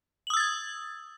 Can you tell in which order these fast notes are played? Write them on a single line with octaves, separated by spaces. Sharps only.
F#7 D#6 E6 A6 G#6